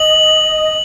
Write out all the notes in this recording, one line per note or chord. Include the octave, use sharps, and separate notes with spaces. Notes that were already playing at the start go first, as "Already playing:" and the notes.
Already playing: D#5 F#7